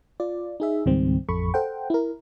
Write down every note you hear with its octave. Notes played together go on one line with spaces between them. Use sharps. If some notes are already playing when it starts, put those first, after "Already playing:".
F4 D5
D#4 G#4 E5
C#2 G#2 D#3 G3 C4
A1 F2 A4 B5 C#6
A4 C5 F#5 G5
E4 A#4